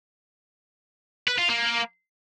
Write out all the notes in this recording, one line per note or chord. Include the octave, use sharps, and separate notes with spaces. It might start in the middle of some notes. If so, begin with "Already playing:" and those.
B4
F4
A#3